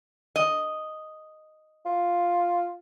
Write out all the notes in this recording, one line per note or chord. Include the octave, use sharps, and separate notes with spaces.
D#5
F4